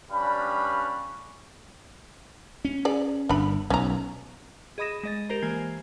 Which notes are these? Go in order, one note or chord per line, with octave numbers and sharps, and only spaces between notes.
G3 C#4 D4 B4 F5 B5
C#4
G#4 D5
G1 D4 B5
B1 C#4 A#5
G#4 D#5 B5 D#6 A#6 E7
G#3 D#5 A6
G4 A#4 C5 A#5
E3 A#3 G#5 G#6 C7